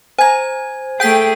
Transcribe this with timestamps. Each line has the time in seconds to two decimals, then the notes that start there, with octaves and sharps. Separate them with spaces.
0.18 C5 G#5 A#5 G#6
1.00 A3 G#4 F#5 G5 G6 B6